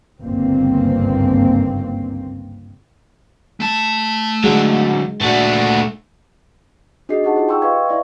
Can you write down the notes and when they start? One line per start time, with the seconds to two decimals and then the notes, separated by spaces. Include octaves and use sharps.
0.21 G1 C#2 G#2 C#3 A#3 C4
3.60 A3 A5
4.44 D3 F#3 G#3
5.21 A#2 A3 D4 F#4
7.09 D4 F#4 G#4 D#5 C7
7.23 D#4 G4 G#4 F#5 A5
7.36 F4 G4 C5
7.49 G5 C6 C#6 E6
7.62 B4 D#5 F5 C#6 G#6
7.89 E4 D5 E5